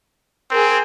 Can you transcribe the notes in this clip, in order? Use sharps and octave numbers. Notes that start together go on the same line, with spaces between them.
C4 G#4 A#4